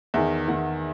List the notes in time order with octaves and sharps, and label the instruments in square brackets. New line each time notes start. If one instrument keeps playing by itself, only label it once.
[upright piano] E2 D#3 E5
E2 D#3 F#5